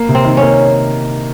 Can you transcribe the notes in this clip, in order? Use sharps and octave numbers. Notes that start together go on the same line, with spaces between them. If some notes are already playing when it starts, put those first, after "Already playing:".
Already playing: A#3
C3
C4
D#3
C#4
A#3